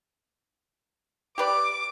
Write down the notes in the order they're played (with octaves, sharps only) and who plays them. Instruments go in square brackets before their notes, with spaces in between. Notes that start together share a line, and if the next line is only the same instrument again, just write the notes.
[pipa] G4 B4 D5 [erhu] D6